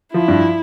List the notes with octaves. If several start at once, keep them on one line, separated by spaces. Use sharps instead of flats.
F3 E4
G2